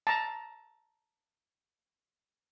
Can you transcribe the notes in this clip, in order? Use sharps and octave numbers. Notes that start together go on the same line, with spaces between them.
A5 A#5